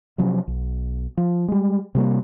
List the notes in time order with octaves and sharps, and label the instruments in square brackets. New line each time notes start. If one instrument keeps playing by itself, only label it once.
[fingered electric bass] C3 F3 F#3 C#4
B1
F3
G3 G#3
C3 G3 A#3